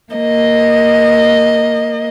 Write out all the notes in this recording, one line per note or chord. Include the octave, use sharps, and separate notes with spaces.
A#3 D#5